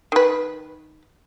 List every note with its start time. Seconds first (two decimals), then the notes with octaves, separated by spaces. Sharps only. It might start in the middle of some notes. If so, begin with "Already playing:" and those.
0.12 D#3 B4